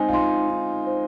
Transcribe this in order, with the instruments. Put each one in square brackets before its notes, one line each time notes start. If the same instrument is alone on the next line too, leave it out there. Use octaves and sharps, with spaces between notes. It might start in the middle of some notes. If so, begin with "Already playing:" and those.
Already playing: [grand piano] G#3 C4 D#4 [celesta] C5 G#5
[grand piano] F4
[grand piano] D#4 [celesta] C6
[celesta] D#4
C5